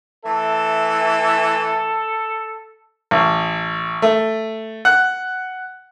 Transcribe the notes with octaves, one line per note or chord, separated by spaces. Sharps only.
E3 A3 A4 E5
A1
A3
F#5